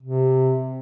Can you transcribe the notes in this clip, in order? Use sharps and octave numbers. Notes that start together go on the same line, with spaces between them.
C3